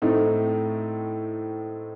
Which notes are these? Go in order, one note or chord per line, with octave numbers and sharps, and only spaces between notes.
A2 A3 C4 D#4